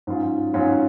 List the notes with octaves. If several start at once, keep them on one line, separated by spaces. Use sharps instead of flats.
G#2 F#3 C#4 F4
G#2 F#3 C#4 F4